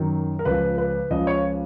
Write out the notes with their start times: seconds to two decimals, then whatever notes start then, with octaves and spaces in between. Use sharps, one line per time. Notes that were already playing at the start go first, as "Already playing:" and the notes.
Already playing: F#2 D#3 F#3
0.39 A#4
0.45 C#2 C#3 F3 B4
0.78 B4
1.10 C#2 C#3 F3 D#5
1.27 C#5